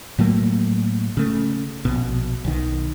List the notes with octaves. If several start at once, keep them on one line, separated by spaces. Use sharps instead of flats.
A2 F#3 A3 A#3
C#3 A3
A#1 B2
B1 D#3